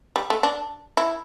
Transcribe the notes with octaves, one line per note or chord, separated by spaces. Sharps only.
G3
A3
D4
E4